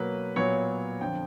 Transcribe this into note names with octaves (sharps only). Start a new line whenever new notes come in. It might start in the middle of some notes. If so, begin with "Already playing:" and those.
Already playing: B2 F#3 A#3 B4
A#2 F#3 B3 C#5
F2 D3 F3 G5